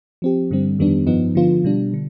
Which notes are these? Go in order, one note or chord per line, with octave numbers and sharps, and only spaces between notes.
F3 C4 G4
G2 D3 G3 C4
F2 D#3 G3 B3 D4
G2 F3 B3 D#4
D3 F3 B3 F4
B2 G3 D4
D3